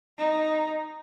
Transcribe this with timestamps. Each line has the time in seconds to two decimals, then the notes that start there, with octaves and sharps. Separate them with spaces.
0.18 D#4